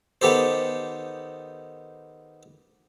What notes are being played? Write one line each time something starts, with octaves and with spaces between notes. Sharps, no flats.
D#3 B3 G4 A4 C5